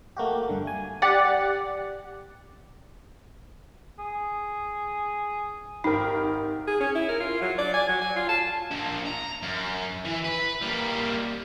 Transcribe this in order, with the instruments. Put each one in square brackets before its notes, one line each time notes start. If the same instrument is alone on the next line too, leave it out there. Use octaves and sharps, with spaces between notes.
[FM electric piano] A3 A#3 F#4 G4
G2 D3
G#5
[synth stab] G4 D5 F#5
[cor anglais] G#4
[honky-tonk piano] G#1 G4 A#4 [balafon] D#4
[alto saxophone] G#4
C#4
E4
A#4
F4
F#3
D5
G#5
F#3
G#5
F4
A5
[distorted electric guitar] A#3 D4
A#5
F#2
E3
B4
G3 A#3